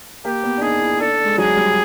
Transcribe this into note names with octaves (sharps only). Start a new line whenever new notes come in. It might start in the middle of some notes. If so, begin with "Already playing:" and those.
A#3 G4
B3
D4
D#4 G#4
E4
D4 A4
D4
G#3
F#3 G#4
G3